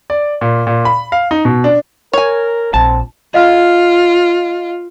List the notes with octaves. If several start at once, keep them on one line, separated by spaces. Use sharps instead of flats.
D5
A#2
A#2
B5
F5
D#4
B2
D4
A#4 C#5 G#5
A#1 C4 A5
F4 D#5 F5 F6